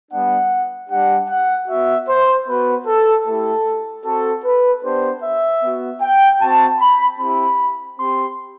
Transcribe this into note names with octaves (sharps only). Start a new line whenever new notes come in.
G3 B3 D4 F#5
G3 D4 G4 F#5
F#5
B3 F#4 E5
C5
B3 F#4 B4
A4
A3 E4 G4 A4
C4 F#4 A4
B4
B3 D4 G4 C5
E5
B3 F#4
G5
C4 F#4 A5
B5
C4 E4 G4 B5
C4 G4 C6